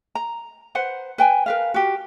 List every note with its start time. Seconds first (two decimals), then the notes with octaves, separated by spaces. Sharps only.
0.15 A#5
0.75 B4 C5 F#5
1.18 B4 G5 G#5
1.46 A#4 B4 F5
1.74 F#4 G4